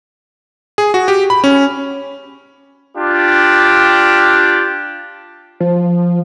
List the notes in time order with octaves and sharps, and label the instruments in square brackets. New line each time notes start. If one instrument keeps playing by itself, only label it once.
[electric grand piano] G#4
F#4
G4
B5
C#4
[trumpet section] D4 F4 G4
[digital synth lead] F3